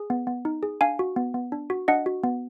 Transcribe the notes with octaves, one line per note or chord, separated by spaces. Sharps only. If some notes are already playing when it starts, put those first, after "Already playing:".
Already playing: G#4
B3
B3
D#4
G#4
D4 F5 G#5
F#4
B3
B3
D4
F#4
D4 D#5 F#5
F#4
B3